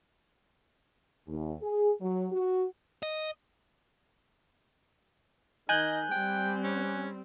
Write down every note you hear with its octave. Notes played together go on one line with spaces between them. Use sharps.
D#2
G#4
F#3
F#4
D#5
D#3 D#5 G#5 F#6 G6
G3 C4 G5
C#4